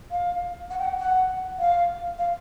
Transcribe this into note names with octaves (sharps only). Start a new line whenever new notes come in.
F5
F#5
G5
F#5
F#5
F5
F5